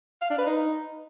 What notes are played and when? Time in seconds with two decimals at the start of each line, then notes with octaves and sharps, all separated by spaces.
0.22 F5
0.30 D4
0.38 B4
0.47 D#4